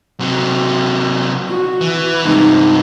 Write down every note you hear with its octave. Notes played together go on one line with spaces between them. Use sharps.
C3 F#3
F#4
E3
G2 C3 G#3 D#4